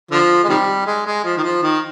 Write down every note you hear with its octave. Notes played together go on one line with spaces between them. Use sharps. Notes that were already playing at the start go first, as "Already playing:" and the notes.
D3 F3
G#3
C3 D#3 G3
G#3
G#3
F3
D#3
F3
D#3